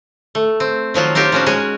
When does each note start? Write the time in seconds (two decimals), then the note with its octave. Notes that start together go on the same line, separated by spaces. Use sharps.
0.35 A3
0.60 C4
0.94 D#3 F3 F#3 F4
1.15 C4 D#4 F4 G4 A#4
1.32 F3 C#4 F#4
1.46 G#3 F#4 G#4 C#5